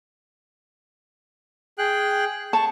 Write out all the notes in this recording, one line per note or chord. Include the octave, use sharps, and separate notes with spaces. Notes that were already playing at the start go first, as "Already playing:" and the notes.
G#4 G5 F#6
A5 C#6